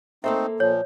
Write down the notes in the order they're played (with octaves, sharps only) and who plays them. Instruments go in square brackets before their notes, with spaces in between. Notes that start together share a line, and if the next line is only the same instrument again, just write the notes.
[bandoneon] A3 C4 D#4 [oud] A#3 A4 C5 [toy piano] E5
[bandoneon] A#2 F3 [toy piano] C#5